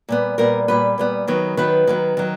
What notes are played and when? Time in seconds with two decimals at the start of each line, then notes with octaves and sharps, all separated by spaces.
0.09 A#2 G3 B3
0.38 A#2 G3 B3 A#4
0.68 A#2 G3 B3 B4
0.98 A#2 G3 B3
1.28 D#3 F#3 B3
1.57 D#3 F#3 B3 B4
1.87 D#3 F#3 B3
2.17 D#3 F#3